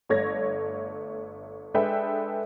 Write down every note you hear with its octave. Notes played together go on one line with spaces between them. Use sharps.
G1 A3 C#5 G#6 A#6
G#3 D4 A4 B4 E5 G5